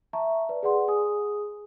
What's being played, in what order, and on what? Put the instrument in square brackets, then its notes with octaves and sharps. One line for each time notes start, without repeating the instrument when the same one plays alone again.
[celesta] E5 A5 A#5 C#6
B4 D5
G#4 B4 D5 F#5 C6
G#4 G#5 D#6